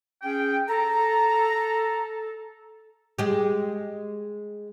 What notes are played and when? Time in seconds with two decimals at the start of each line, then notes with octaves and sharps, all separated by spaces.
0.22 C#4 G#4 G5
0.68 A4 A#5
3.19 G#3 G4